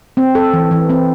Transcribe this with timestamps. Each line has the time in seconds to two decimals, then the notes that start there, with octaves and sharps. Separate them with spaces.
0.17 C4
0.35 A4
0.53 E3
0.71 E3
0.89 C4